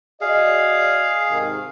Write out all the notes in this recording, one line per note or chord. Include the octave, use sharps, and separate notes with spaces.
F#4 G#4 D5 D#5 F5
G#2 C3 D#3